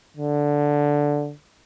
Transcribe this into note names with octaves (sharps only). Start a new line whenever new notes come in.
D3